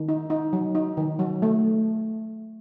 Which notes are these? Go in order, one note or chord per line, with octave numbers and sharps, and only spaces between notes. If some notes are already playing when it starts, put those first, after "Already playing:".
Already playing: D#3
D#4
D#4
F#3
D#4
D#3
F#3
A3